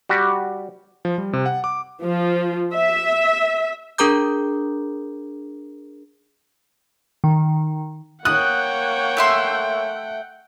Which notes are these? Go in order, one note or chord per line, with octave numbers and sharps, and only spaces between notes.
G3 F#4 G4
F3
G3
C3
F#5
D6
F3
E5
D4 G#4 A#4 A#5 D6 G6
D#3
A#3 C#5 F#5 G5 D#6 F#6
A3 E5 C6